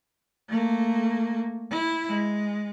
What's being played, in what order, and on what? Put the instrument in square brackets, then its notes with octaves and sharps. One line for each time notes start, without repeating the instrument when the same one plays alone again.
[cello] A3 A#3
E4
G#3